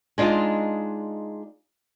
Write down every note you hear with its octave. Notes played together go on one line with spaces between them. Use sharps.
G#3 D4 D#4 F4